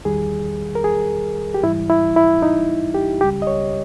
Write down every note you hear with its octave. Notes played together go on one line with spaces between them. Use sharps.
E2 D#3 G3 G#4
A#4
G#4
G4
G#2 E3 G3 E4
E4
E4
D#4
G4
C#2 C#3 G3 G4
D#5
C#5